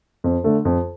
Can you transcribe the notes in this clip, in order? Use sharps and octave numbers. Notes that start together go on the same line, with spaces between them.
F2
D3 A3 D4
F2